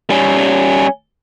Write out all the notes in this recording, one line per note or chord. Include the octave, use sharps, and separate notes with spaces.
G3 C#4